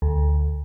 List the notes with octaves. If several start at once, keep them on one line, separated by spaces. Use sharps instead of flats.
D2